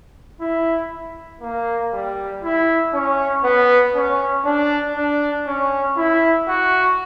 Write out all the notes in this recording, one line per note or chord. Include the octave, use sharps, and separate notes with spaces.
E4
A#3
G3
E4
C#4
B3
C#4
D4
D4
C#4
E4
F#4